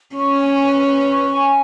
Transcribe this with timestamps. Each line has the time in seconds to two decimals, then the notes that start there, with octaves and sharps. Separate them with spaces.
0.16 C#4 C#6
0.40 G#5
0.63 B4
0.86 B4
1.09 C#6
1.32 G#5